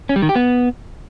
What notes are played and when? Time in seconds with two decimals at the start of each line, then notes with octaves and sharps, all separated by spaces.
0.09 C#4
0.16 G3
0.22 D#3
0.29 G4
0.36 B3